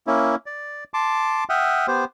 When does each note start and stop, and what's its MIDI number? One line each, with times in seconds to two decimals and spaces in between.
0.07 0.35 58
0.07 0.35 61
0.07 0.35 64
0.46 0.84 74
0.94 1.44 81
0.94 1.44 84
0.94 1.44 86
1.50 1.87 76
1.50 1.87 78
1.50 1.87 79
1.50 1.87 87
1.50 1.87 89
1.88 2.05 59
1.88 2.05 67
1.88 2.05 72